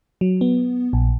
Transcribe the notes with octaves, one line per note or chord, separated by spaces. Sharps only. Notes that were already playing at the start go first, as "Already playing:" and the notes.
F#3
B3
A#1